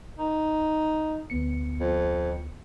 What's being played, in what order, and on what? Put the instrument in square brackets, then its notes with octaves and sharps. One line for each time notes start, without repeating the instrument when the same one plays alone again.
[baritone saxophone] D#4
[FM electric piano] D2 B3 C#7
[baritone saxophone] F2